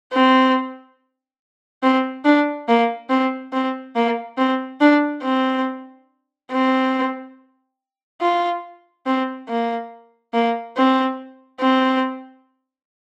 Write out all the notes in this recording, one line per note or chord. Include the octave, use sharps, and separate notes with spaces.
C4
C4
D4
A#3
C4
C4
A#3
C4
D4
C4
C4
F4
C4
A#3
A#3
C4
C4